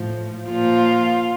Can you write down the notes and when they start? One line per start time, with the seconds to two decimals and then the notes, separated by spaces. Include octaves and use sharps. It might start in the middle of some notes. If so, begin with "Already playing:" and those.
Already playing: A2 F3
0.48 A#2 F3 F4